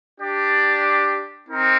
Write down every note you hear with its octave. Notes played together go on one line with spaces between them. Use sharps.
D4 G4 D5
C4 D#4 A#4